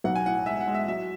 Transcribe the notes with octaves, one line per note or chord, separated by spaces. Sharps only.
B1 F#5
G#5
A2 F#5
G#3 E5
F#5
G#3
E5
F#3 E5